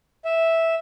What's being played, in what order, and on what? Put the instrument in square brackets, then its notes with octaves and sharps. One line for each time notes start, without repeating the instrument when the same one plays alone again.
[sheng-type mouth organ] E5